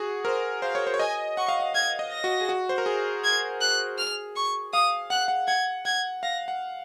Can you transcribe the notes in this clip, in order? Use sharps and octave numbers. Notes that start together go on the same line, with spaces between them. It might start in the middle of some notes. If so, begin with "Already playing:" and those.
Already playing: F#4 G#4
A#4 C5
C5 F5
C#5
C5
C#5
D#5 G#5
F#5 C#6
F5
F#5
F5 G#6
D#5
A#6
F#4
G#4
F#4
C5
A#4
G#4
G#6
F#6
F6
C#6
F5 D#6
F#5 F#6
F#5
F#5 G#6
F#5 G#6
F5 A#6
F#5